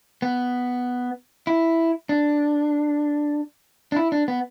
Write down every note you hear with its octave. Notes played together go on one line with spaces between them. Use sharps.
B3
E4
D4
D4
E4
D4
B3